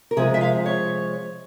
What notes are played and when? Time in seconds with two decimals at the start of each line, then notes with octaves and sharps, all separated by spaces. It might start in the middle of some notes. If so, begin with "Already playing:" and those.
0.11 A#4
0.17 C3 F3 G#3 G#4
0.34 E5
0.41 F5
0.66 C#5